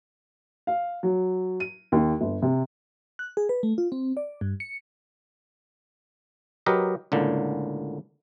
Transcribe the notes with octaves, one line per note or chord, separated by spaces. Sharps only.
F5
F#3
D#7
D#2
G1
C3
F#6
G#4
B4
A3
F4
C4
D5
G2
C#7
F#3 G4 A#4 B4 D#5
C#2 A2 D3 A#3